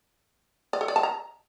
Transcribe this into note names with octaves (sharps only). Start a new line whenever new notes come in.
D5
A4
D5
A5
A#5